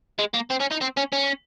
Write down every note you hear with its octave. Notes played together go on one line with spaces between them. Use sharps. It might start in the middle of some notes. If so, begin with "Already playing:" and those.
G#3
A#3
C4
C#4
D#4
C4
C#4
C#4